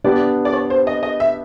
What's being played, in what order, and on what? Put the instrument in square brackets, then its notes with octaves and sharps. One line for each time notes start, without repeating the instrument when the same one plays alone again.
[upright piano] B3 D4 G4 [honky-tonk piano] D5
[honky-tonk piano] D5
C#5
C5
D#5
D#5
E5